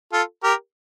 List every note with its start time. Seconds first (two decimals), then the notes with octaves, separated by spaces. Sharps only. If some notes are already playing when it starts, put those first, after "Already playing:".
0.13 F4 A4
0.44 G4 A#4